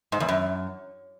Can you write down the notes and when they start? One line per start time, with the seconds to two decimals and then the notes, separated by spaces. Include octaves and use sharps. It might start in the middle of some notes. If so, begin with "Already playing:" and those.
0.12 G#2
0.20 E2
0.28 F#2